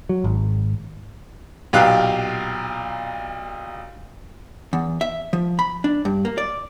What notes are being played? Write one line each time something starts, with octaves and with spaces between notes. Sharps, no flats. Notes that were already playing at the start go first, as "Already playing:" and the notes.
F#3
G#1
B1 A#2 G4 F5 F#6
E2
E5
F3
B5
D4
G2
A#3
D5